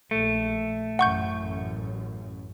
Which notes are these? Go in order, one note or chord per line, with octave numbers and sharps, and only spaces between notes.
A#1 A3
A1 F#2 F#5 C#6 G6